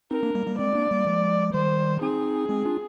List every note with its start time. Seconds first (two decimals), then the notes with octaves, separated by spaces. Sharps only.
0.11 C4 D#4 A#4
0.23 A#3 D4
0.35 G3 A#3
0.47 G3 A#3
0.58 G#3 C4 D5
0.75 A#3 D4
0.91 G3 A#3
1.06 F3 G#3
1.54 D#3 G3 C5
2.01 C4 D#4 G#4
2.49 G#3 C4
2.65 D4 F4